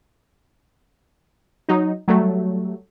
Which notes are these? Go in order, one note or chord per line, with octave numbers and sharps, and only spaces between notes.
F#3 D#4
F#3 G3 A3